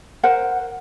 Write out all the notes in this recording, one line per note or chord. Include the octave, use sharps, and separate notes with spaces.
A#4 C5 F#5